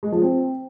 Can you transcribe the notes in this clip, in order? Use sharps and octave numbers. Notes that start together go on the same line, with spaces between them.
G#3
F3
C4